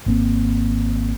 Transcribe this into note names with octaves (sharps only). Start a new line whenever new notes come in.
G#1 A#3 C4